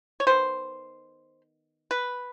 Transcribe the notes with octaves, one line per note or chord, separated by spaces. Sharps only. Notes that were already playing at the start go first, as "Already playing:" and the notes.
C#5
D#3 G3 B3 C5
B4